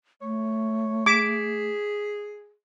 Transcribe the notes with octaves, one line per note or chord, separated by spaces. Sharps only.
A3 C#5
G#4 D6 G#6 B6 E7